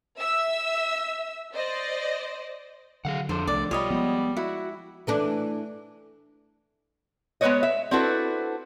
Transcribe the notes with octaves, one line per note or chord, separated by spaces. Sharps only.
E5 E6
C5 D5 D#5
D3 F#3 G#4 F5 F#5
F2 F3 D4 A4 C5
C2 A3 D5
B1 G3 F4 C#5 D#5 B5
F3 F#3 G#3 B3
E4 F#4
E3 A3 D4
G#3 B3 C#4 B4 C#5 D#5
E5
C4 D4 E4 F#4 A4 B4